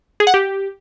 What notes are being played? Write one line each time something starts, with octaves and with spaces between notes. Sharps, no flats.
G#4
F#5
G4